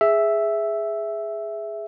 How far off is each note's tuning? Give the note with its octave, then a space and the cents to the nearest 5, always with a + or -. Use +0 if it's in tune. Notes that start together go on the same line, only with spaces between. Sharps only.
G#4 +0 E5 +0